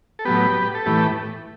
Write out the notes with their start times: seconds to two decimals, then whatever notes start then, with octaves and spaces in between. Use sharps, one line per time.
0.19 A4
0.25 A2 F#3 B3 G4 B4
0.74 A4
0.86 A2 E3 A3 G4 B4